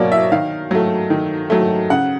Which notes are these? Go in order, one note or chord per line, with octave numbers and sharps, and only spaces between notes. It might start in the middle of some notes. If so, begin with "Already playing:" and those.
Already playing: B2 F#3 A#3 C#5 D5
E5
D#3 F5
F#3 A3
D#3
F#3 A3
C#3 F#5